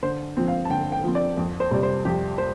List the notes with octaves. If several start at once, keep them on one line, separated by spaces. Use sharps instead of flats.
D3 C5
F3 C4
F5
A5
D3 G5
G5
F3 C4
D5
F2
C5
C3 G3 D5
C5
F2 G4
C5